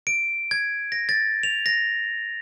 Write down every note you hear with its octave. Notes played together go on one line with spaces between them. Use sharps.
D7
G#6
A#6
A6
F7
A#6